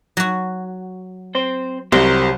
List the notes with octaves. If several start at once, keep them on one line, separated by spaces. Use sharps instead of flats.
F#3 F#4
C4 C5
C2 F#3 G4 A#4 C5